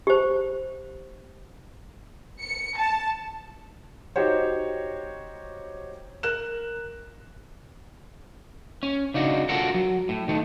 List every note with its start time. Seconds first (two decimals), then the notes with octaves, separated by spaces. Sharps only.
0.07 G4 C5
2.41 C#7
2.78 A5
4.16 D#4 F#4 G4 C5 C#5
6.23 A#4 F#6 E7
8.83 C#4
9.14 C#3 D4 D#4 F#4
9.49 F4 F#4 A4 A#4 F#5
9.74 F#3
10.09 A2
10.28 D#3 A3